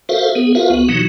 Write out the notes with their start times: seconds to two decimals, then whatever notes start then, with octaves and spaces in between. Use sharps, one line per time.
0.09 F#4 A4 A#4 C5 E5 F5
0.35 B3 G#4
0.55 F4 F#4 A#4 B4 E5 F5
0.70 C#2 B3 F#4
0.89 B2 E3 F#3 D#4 F#4